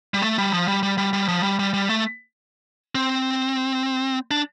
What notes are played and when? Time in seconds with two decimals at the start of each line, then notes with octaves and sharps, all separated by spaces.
0.14 G3
0.22 A3
0.38 G3
0.53 F3
0.68 G3
0.83 G3
0.98 G3
1.13 G3
1.28 F3
1.43 G3
1.59 G3
1.74 G3
1.89 A3
2.95 C4
4.31 D4